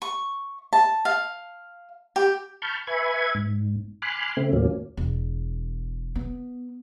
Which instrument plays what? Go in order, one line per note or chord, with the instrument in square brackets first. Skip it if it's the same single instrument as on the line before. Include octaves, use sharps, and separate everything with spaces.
[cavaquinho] C#6
A5
F5
G4
[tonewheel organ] A5 B5 C#6 F6 G6
B4 E5 G#5 B5 C#6 G#6
G#2
G#5 B5 C6 D6 F6 F#6
C#3 A3 C4
D#2 A2 F#3 A#3 C#4
[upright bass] E1
B3